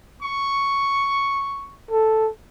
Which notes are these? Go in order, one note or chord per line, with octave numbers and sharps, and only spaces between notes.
C#6
A4